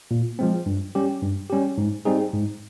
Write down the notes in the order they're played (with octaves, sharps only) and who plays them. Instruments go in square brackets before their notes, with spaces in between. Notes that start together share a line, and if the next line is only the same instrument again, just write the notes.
[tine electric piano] A#2
F3 G#3 C4
G2
G3 C#4 G4
G2
G3 C#4 G4
G#2
G3 C4 D#4 G#4
G#2